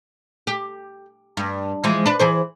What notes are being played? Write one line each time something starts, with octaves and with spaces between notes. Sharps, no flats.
G4
G2
E3 F3 G#3
D4 B4
E3 G#4 C5